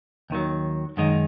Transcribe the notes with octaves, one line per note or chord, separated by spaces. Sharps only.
D#2 D#3 F#3
F#2 D#3 G#3 D#4